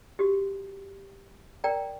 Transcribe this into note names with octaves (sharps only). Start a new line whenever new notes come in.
F#4 G4
A#4 D5 G5 A#5